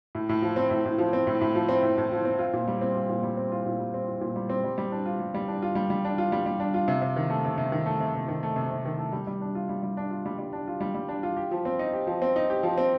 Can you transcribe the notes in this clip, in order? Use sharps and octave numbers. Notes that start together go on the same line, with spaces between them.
A2
A2
F3
C4
A2
A2
F3
C4
A2
A2
F3
C4
A2
A2
F3
C4
F4
A#2
G3
C4
F4
A#2
G3
C4
F4
A#2
G3
C4
F4
A#2
G3
C4
G3
G3
D4
F4
G3
G3
D4
F4
G3
G3
D4
F4
G3
G3
D4
F4
C3
C3
D#3
A3
C3
C3
D#3
A3
C3
C3
D#3
A3
C3
C3
D#3
A3
G3
G3
D4
F4
G3
G3
D4
F4
G3
G3
D4
F4
G3
G3
D4
F4
G4
F3
C4
D#4
G4
F3
C4
D#4
G4
F3
C4